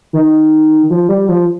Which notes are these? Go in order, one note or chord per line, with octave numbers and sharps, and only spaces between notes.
D#3
F3
G3
F3